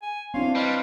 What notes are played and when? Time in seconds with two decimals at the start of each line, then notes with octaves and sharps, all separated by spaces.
0.02 G#5
0.34 C4 D4 E4 C#5 F5 C6
0.55 G3 B4 C5 D#5 F5